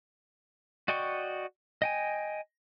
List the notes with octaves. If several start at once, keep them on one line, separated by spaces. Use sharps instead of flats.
F#4 D5 D#5 G5 C#6
D#5 G5 G#5